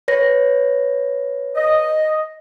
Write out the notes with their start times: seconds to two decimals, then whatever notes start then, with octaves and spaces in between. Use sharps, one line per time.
0.08 B4 C#5 A#6
1.55 D#5